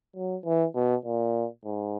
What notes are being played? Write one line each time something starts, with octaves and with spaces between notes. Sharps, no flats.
F#3
E3
B2
A#2
G#2